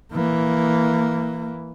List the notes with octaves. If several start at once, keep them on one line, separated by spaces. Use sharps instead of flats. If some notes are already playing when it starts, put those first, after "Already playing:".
E3 A#3